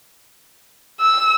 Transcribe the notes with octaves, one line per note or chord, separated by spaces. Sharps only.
E6